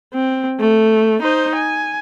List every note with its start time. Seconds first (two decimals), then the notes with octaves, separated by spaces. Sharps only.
0.14 C4
0.60 A3
1.22 D#4 C5
1.55 G#5